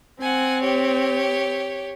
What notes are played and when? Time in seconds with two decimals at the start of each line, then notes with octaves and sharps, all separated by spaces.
0.21 C4 F#5 G#5
0.60 G4 C#5